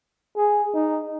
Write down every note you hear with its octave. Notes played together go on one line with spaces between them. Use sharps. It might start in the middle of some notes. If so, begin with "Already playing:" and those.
G#4
D#4